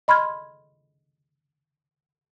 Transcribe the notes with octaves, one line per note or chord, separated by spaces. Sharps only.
D#5 B5 C6 F6 G#6